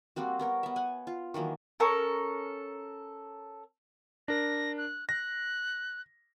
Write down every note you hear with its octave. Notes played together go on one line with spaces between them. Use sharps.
G3 A#3 C4 F#4
B3 A#4 C#5
B3 E5
F#5 G#5
F4
D#3 E3 F#3 A#3
C#4 A4 A#4
D4 A#4 A#6
F#6
F#6 A#6